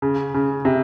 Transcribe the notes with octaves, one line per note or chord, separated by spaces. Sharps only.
C#3
C#3
C3